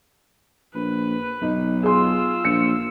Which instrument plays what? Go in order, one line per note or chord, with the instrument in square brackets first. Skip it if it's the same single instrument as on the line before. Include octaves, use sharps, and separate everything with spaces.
[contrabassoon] A#1 [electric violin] B4
[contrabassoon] B1 [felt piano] D#4
[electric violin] F4 E6 [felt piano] G#4 C6
[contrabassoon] A#1 [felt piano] C#7